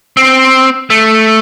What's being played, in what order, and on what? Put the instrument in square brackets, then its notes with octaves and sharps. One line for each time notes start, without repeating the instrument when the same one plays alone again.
[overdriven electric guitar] C4
A3